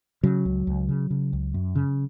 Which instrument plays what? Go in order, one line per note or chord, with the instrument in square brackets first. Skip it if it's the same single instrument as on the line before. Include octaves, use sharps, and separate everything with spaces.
[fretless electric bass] C#3 F#3
C#2
C#2
C#3
C#3
C#2
F#2
C#3